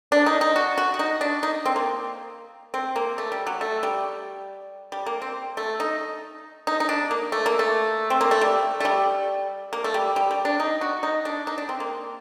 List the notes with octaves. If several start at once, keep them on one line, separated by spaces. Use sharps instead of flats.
D4
D#4
D#4
F#4
F#4
F#4
D#4
D4
D#4
C4
A#3
C4
A#3
A3
G3
F#3
A3
G3
G3
A#3
C4
A3
D#4
D#4
D#4
D4
A#3
A3
A#3
A3
C4
A#3
A3
G3
A3
G3
A#3
A3
G3
G3
G3
D4
D#4
F#4
D#4
D4
D#4
D4
C4
A#3